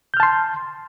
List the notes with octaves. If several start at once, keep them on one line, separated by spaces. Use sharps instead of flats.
A5 C6 F6 G6